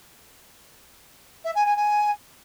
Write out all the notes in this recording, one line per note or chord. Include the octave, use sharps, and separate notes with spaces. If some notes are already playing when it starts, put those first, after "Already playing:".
E5
G#5
G#5
G#5